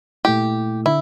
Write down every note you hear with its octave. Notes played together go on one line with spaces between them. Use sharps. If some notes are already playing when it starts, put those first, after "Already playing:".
A#2 A3 E4 G4
D3 E4